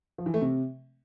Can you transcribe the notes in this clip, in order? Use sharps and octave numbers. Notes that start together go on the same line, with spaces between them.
F3
E3
A3
C3